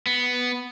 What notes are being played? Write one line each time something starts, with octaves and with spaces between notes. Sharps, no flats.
B3